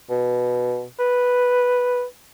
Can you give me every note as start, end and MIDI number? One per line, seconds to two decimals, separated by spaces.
0.10 0.85 47
0.99 2.04 71